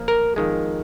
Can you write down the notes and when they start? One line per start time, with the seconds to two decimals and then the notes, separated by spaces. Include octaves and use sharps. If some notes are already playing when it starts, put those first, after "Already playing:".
Already playing: A#2 F3 A#3
0.08 A#4
0.36 F2 D#3 G#3